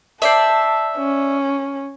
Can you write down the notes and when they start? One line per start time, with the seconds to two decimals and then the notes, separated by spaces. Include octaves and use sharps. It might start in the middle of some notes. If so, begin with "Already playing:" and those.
0.22 C5 D5 E5 A5
0.97 C#4